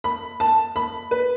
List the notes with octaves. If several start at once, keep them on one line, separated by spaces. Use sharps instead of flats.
B5
A5
B5
B4